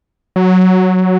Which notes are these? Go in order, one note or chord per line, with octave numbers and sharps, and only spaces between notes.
F#3